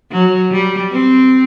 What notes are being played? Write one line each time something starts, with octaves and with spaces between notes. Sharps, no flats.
F#3
G3
C4